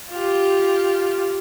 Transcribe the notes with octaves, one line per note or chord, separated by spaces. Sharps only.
F4 G4